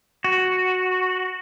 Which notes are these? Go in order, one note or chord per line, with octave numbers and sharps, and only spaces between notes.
F#4